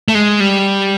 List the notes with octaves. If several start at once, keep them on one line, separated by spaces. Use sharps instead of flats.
A3
G#3
G3